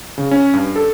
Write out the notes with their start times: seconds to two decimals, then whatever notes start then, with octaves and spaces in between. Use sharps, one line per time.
0.18 C#3
0.31 C#4
0.53 G2
0.76 A4